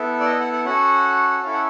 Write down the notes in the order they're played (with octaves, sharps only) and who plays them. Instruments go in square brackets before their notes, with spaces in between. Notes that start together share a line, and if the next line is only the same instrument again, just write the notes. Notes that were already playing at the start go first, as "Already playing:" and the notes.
Already playing: [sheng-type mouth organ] B3 E4 A4
D5
D#5
F#5
F#5
C#4 F#4 A4 F#5
C#4 E4 A4 F5
F#5